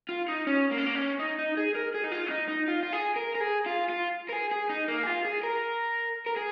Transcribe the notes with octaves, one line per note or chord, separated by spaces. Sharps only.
F4
D#4
C#4
A#3
C#4
A#3
C#4
D#4
D#4
G#4
A#4
G#4
D#4
F4
C#4
D#4
D#4
F4
F4
G#4
A#4
A#4
G#4
F4
F4
A#4
G#4
G#4
D#4
A#3
G#4
F4
G#4
A#4
A#4
G#4